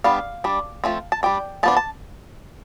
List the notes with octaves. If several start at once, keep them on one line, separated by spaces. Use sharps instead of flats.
G3 B3 D4 F5
G3 D4
F3 A3 C4
A5
G3 D4 G5
F3 B3 D4 A5
A5